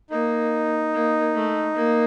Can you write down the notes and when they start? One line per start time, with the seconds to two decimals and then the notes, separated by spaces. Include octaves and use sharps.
0.10 A#3 D#4
0.94 A#3
1.35 A3
1.75 A#3